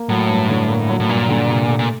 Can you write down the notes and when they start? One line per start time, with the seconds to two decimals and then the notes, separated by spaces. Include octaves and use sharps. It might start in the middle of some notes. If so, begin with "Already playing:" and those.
Already playing: A#3
0.09 A2 F#3
0.30 G2
0.49 D3
0.69 A#3
0.89 F#3
1.00 A2
1.09 G2 A#2
1.29 D3
1.48 C3
1.68 A3
1.79 A#2